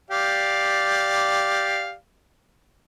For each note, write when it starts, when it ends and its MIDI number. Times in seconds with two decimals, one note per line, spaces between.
0.11 1.94 67
0.11 1.94 74
0.11 1.94 77